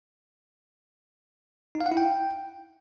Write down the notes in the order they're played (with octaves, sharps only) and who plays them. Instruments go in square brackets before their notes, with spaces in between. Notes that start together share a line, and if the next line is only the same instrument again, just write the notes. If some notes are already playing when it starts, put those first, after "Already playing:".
[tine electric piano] D#4
F5
F#5
E4
G5